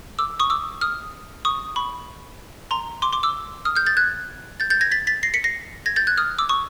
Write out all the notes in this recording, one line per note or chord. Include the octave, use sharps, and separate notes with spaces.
D6 E6
C#6 D#6
D6 E6
D#6 F6
C#6 D#6
B5 C#6
A#5 C6
C6 D6
C6 D6
D6 E6
D#6 F6
F6 G6
G6 A6
F#6 G#6
G6 A6
G6 A6
G#6 A#6
A6 B6
A6 B6
A#6 C7
B6 C#7
A#6 C7
G#6 A#6
G6 A6
F#6 G#6
D#6 F6
D6 E6
C#6 D#6